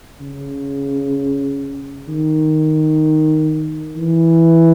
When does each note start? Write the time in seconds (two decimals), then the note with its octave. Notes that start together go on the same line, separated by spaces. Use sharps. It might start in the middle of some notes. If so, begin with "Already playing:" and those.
0.20 C#3
2.08 D#3
3.96 E3